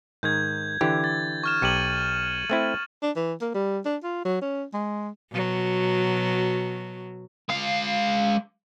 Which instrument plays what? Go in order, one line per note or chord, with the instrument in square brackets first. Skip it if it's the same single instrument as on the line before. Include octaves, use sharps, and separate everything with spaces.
[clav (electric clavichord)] G#2 D#3 [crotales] G6 G#6
[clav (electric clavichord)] D3 E3 G4
[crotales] A6
C#6 F6 E7
[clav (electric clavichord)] B1 G4 [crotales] C#7 D#7 F#7
[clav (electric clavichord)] A3 C4 E4
[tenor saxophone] D4
E3
A#3
G3
D4
F4
F#3
C#4
G#3
[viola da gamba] B2 F#3
[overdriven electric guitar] G#3 F5